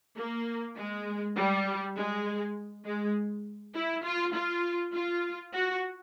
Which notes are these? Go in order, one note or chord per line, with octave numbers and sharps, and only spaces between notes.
A#3
G#3
G3
G#3
G#3
E4
F4
F4
F4
F#4